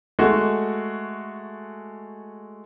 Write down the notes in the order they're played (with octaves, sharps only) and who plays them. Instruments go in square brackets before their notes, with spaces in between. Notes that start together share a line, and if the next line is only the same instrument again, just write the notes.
[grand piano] G#3 A3 F#4